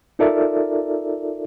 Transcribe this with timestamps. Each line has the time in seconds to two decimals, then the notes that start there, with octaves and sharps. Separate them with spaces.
0.19 D#4 F4 A4 A#4 D5 E5